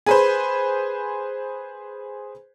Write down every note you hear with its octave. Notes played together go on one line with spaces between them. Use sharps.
G#4 B4 C5